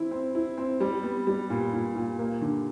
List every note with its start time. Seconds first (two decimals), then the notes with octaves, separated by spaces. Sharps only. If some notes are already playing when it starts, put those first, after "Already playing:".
Already playing: E3 C4 E4
0.11 C4
0.35 E4
0.57 C4
0.80 G3
1.03 B3
1.27 G3
1.50 A#2
1.73 A#2
1.95 A#2
2.19 A#3
2.41 D3